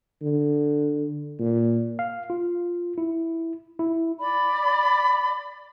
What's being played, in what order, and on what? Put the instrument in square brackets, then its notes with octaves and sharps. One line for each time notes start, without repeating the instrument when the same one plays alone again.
[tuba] D3
A#2
[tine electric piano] F5
F4
E4
E4
[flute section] D5 B5